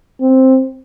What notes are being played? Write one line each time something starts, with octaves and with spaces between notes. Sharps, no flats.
C4